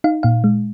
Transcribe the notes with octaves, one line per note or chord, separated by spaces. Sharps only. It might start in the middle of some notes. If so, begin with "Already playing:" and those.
D#4 F5
A#2 F5
G#3